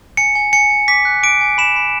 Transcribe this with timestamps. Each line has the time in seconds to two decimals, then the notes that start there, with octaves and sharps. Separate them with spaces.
0.17 G#5 C#7
0.35 G#5
0.53 G#5 C#7
0.70 G#5
0.88 D6 B6
1.05 F#6
1.23 D6 D7
1.41 G#5
1.58 B5 E7
1.76 B5